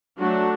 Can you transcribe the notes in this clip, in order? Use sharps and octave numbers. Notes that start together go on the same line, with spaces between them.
F#3 A3 D4 F#4